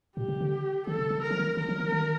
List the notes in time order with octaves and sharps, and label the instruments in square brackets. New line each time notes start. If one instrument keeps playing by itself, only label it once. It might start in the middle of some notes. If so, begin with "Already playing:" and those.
[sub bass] A#2 [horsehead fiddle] G4
[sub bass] C3
D3
[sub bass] D#3 [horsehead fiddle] A4
[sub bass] C3
D3
[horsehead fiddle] A#4
[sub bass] F3
D#3
[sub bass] D#3 [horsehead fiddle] A#4
[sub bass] F3
D#3
D#3